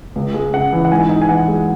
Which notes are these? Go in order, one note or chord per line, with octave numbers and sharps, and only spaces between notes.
C#2
G#3
C#3 F#5
E3
F#5
G#2 G#5
D#4
G#5
E3 F#5
G#3